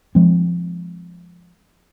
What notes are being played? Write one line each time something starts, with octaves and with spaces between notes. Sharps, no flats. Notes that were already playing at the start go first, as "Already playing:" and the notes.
F3 G#3 C4